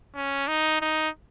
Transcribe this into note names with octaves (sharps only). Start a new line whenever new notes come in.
C#4
D#4
D#4